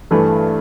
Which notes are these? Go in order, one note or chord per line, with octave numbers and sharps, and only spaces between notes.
G2 E3 A3